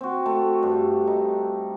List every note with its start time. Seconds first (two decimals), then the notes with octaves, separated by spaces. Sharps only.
0.01 C4 F#4
0.26 A3
0.63 G2
1.07 D#4